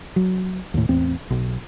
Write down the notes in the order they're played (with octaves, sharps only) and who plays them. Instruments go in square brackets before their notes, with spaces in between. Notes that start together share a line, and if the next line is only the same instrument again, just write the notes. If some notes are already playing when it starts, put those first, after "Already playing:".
[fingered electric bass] F#3
D#2 A2
A1 E2 C4
B1